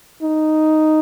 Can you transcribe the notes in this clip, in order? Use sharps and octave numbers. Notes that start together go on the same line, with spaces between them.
D#4